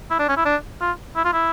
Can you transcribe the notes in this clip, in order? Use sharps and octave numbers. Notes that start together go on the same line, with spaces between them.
E4
D4
C#4
E4
D4
F4
E4
F4
E4